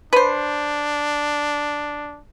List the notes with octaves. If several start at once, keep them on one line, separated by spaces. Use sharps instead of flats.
D4 B4 C5